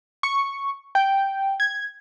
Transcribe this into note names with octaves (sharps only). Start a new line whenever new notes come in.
C#6
G5
G#6